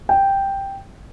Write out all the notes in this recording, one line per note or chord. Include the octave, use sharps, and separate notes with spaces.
G5